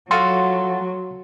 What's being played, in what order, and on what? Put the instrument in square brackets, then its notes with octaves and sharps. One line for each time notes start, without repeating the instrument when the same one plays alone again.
[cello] F#3 [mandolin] F4 F#4 A4 [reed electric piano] C6